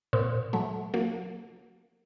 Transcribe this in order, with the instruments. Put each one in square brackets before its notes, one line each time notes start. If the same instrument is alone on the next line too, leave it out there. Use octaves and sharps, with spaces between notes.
[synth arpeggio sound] A#2 C4
F#3 A3
F#3 A#3